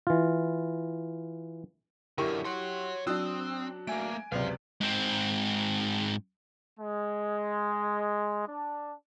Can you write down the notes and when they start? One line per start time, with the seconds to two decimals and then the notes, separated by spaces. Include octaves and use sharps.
0.07 E3 F4
2.18 F#2 D3 E4 G4 A#4 C#6
2.45 C#5 F#5 C6
3.07 F#3 C4 D4 D#6 E6 F#6
3.87 A3 A#3 G#5 D7
4.32 C#2 F#2 C3 B4 C5 D5 F5
4.81 G#2 C4
6.80 G#3
8.47 D4